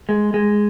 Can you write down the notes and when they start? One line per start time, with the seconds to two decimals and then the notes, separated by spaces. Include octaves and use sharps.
0.09 G#3
0.34 G#3